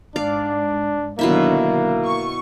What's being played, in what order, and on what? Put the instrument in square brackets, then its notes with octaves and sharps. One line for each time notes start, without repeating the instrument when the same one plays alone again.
[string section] G#2 [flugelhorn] D4 [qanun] D5 F5
[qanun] B2 E4 E5 [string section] D3 D#3 F#3 [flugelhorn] A#3
[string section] C#6